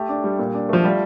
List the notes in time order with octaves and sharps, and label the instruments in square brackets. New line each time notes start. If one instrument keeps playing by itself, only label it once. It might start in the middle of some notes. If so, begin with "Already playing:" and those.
Already playing: [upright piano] A3 G4
D4
G3
A#2
D4
[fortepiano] F3 [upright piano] A3
[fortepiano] G3 [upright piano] F4